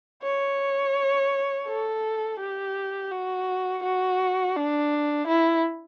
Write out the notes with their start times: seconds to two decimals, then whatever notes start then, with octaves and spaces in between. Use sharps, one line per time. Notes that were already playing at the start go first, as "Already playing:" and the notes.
0.23 C#5
1.67 A4
2.39 G4
3.11 F#4
3.83 F#4
4.56 D4
5.27 E4